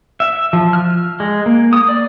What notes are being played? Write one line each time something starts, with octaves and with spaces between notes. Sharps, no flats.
E5
F3
F6
G#3
A#3
D#6
D5